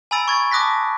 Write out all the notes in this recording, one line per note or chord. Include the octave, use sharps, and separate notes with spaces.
G#5 A#5 B5 E6 A6 D7
C#6 G#6 A6
A5 D6 D#6 F#6 A#6 B6